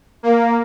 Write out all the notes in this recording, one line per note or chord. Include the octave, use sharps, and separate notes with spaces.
A#3